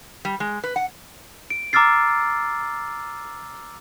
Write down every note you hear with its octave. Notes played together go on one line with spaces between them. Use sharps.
G3
G#3
B4
F#5
D7
A#5 D6 E6 F6 A6 C7